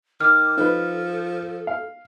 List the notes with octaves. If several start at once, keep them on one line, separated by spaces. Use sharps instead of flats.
D#3 D6 F6
F3 D#4 A4 B4
F5